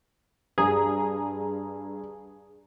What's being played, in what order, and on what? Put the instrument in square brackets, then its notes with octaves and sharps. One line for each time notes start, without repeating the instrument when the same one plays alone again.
[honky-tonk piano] G2 A#5 [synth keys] G#4